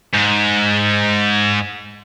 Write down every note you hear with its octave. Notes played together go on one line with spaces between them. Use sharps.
G#2